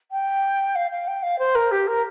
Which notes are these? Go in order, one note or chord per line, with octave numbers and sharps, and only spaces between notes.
G5
F5
F5
G5
F5
C5
A#4
G4
A#4